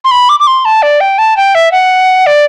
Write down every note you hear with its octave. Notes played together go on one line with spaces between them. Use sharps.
C6
B5
D6
D6
C6
A5
D5
G5
A5
G5
E5
F#5
D5